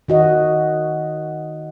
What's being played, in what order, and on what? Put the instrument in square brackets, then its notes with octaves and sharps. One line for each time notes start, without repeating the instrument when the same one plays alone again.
[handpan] D#3 F#4 D#5